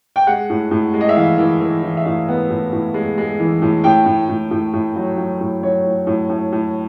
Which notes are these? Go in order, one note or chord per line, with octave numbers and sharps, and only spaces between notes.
G5
G#3 F#5
A2
A2
G#3
D#5
E5
E3 F5
E3
E3
E3
E5
A2 F5
B3
A2
A2
G#3
G#3
E3
A2
A2 G5
A2
A2
A2
A2
F#3
F#3
A2
F#3 C#5
A2
A2
A2
A2